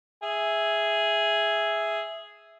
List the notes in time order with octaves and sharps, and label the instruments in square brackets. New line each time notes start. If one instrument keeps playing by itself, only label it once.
[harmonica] G#4 E5